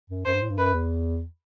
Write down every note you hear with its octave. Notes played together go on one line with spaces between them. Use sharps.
F#2
F#2 C5
G2
A2
G2
F#2 B4
E2